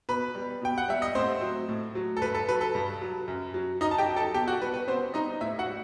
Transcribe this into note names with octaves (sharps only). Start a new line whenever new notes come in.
B2 B4 B5
G3
B2 G5
F#5
G3 E5
D#5
A2 C4 C5
F#3
A2
F#3
A4
G2 B4
A4
F#3 B4
A4
G2
F#3
F#2
F#3
F#2 D#4 D#5
A5
G4 G5
F#3
A4 A5
B2 G4 G5
F#4 F#5
G3 B4
B4
B2 C4 C5
G3 D#4 D#5
A2 E4 E5
F#4 F#5
G3